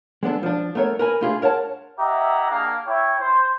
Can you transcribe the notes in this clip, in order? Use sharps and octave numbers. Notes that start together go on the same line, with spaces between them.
G#3 B3 D4 A4
F3 D4
A3 B3 A#4 C#5
A#4 B4 G#5
A3 D4 F4 G4 G#4
A#4 C#5 F#5 A5
E4 G4 D#5 E5 F#5 A#5
A#3 D4 G#4 A#4 F5 A#5
E4 C#5 G5
C5